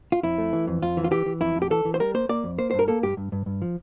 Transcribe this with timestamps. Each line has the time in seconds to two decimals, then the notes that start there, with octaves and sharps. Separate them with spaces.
0.12 F4
0.23 F2 E4
0.38 A3
0.53 E3
0.67 F2
0.82 F2 F4
0.97 E3
1.04 F4
1.11 E3 G4
1.26 E3
1.41 F2 E4
1.55 F2
1.62 G4
1.70 E3 A4
1.85 E3
1.94 C5
2.00 G3 A#4
2.14 A#3 C5
2.29 A#3 D5
2.44 F2
2.58 A#3 C5
2.71 G2 C5
2.79 A#4
2.88 A#3 A4
3.03 G2 G4
3.17 G2
3.32 G2
3.46 G2
3.62 F3